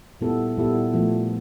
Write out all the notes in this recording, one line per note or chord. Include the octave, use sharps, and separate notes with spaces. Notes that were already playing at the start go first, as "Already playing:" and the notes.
A#2 G3 B3 E4 A4
A#2 G3 B3 E4 A4
A#2 F3 A3